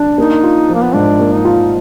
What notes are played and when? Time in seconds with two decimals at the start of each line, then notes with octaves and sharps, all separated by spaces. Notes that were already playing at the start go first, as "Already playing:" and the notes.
Already playing: D4
0.18 A#3 D#4
0.43 F4
0.69 F3
0.74 A#3
0.84 B3
0.94 G#2 D4
1.20 A#3
1.33 D#4
1.45 F4